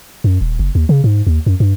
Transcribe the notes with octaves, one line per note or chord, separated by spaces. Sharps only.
F#2
D#1
F#1
D#2
C#3
G#2
D#2
F#2
G2